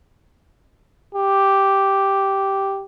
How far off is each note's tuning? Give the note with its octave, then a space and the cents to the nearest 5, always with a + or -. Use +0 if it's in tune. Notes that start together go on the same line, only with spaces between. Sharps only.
G4 -5